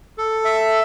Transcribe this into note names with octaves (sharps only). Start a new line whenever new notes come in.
A4
E5